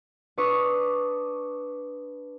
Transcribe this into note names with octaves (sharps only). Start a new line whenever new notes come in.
D4 B4 C#6 D#6 E6